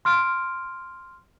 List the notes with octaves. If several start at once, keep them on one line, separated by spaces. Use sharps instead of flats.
C6 F6 D7